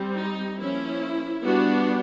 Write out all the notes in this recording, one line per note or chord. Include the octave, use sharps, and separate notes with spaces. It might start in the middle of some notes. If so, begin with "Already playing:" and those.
Already playing: G3 C4
D#4
F3 A#3 C#4 E4
G3 B3 D4 F#4